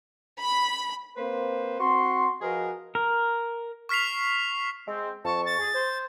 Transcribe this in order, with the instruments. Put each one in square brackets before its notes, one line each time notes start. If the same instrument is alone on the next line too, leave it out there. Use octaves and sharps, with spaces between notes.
[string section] B5
[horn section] A#3 C4 B4 C5
C4 F#4 C6
F3 F#4 G#4 A#4 B4 D#5
[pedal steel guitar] A#4
[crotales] C#6 F6 B6 C7 F7
[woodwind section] G#3 C4
[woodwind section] F2 C#6 [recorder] A5
[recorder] A6
[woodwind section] G#4
C5